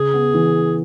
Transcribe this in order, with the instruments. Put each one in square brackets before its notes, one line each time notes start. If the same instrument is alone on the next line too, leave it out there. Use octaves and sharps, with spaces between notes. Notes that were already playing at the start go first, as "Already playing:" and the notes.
Already playing: [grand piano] C#3 [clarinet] G#4
[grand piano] B3
E3